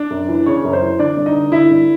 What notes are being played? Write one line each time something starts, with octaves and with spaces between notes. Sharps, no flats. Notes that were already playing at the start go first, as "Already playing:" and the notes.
Already playing: D4 D5
F#2
E3
C#3 C#5
F#2
C5
E3
D3 D4 D5
G2
D#4 D#5
D3
D3 E4 E5
G2